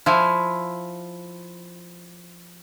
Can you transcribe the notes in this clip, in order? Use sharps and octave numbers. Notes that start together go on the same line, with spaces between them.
F3 E4 G#5